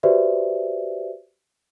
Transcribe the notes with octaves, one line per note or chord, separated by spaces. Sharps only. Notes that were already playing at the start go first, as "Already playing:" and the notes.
F#4 G4 B4 C5 D5 E5